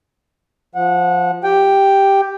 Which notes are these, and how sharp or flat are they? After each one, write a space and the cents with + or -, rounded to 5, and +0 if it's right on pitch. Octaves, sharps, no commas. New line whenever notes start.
F3 +0 F#5 -25
G4 +0 G5 +0